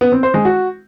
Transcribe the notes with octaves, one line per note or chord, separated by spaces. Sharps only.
B3
C4
C5
G#3
F#4